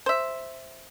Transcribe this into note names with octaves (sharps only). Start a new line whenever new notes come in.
C5 E5